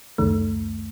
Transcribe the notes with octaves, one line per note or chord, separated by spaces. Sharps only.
C#2 F#2 D#3 A3